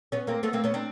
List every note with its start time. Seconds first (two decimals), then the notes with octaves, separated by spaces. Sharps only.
0.12 B3 C#4
0.27 A#3 C4
0.43 A3 B3
0.53 A#3 C4
0.64 B3 C#4
0.74 C4 D4